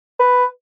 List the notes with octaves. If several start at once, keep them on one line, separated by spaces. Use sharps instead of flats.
B4